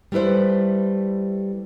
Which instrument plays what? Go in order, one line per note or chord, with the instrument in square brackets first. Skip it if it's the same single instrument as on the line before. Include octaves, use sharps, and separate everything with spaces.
[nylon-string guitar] G3 A3 E4 B4 C5